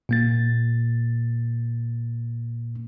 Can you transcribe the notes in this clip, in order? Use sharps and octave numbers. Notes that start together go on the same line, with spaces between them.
A#2 A#3 A6